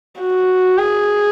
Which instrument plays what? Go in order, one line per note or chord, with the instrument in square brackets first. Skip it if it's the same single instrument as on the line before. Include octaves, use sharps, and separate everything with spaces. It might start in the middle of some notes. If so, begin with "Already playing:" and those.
[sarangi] F#4
G#4